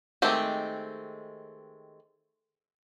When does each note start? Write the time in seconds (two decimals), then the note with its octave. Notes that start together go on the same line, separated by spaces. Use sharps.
0.22 D#3 G#3 A3 C4 G4